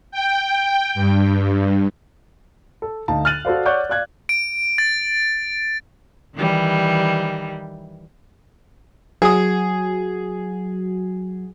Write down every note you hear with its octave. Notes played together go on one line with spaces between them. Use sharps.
G5
G2
A4
D2 D#4 F5 A5
F6 F#6 A6 D#7 F#7
F#4 A4 C5 D5 F5
C#5 D5 F#5 C#6 F#6 G6
D5 F5 F#6 G#6
D7
A6
D#3 E3 G3
F#3 F#4 G#4 D#6